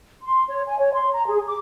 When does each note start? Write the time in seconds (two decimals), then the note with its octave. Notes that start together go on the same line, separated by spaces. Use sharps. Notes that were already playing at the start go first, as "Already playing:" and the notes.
0.24 C6
0.49 C#5
0.67 G#5
0.80 C#5
0.94 C6
1.13 A#5
1.26 G#4
1.47 D6